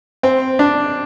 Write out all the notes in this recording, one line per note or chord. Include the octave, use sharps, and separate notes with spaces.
C4
D4